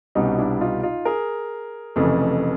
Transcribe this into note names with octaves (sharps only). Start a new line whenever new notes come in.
C2 B2 G3 C#4 D#4
D4 E4
D#4 F4
D#4 F4
G#4 A#4
F1 F2 C#3 E3 A3